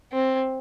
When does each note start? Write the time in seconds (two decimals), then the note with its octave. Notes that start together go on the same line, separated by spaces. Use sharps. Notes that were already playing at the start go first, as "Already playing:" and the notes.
0.12 C4